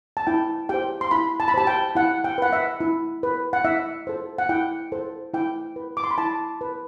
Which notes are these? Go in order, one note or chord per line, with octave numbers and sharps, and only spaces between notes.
A5
E4 G5
G4 C5 G5
C6
E4 B5
A5
B5
G4 C5 A5
G5
E4 F#5
G5
B4 F#5
E5
E4
B4
F#5
E4 E5
A4 C5
F#5
E4 G5
A4 C5
E4 G5
B4
D6
C6
B5
E4 A5
B4